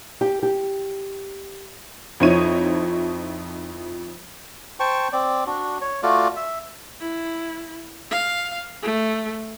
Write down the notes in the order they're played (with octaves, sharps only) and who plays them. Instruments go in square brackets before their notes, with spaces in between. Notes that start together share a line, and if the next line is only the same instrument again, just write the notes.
[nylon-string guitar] G4
G4
[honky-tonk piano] F2 F3 D#4 E4 C#5 D#7
[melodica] C5 G5 A5 C#6
C4 D5
D4 F#4
C#5
A3 F4 F#4 D5
E5
[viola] E4
F5
A3